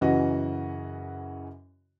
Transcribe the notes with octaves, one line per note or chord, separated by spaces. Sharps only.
F#2 C#3 E3 F#4 D#5